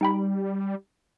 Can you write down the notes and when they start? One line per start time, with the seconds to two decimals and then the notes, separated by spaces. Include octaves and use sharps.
0.01 G3 D#4 G5 B5